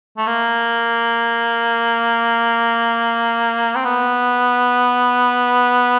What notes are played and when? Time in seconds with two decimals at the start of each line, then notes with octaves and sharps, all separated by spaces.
0.18 A3
0.27 A#3
3.76 C4
3.85 B3